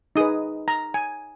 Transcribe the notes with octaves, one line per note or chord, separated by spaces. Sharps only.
D#4 G#4 B4 D#6
A#5
G#5